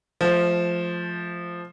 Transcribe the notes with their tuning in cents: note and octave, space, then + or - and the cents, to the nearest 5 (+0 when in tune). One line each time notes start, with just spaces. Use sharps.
F3 +0 A3 -30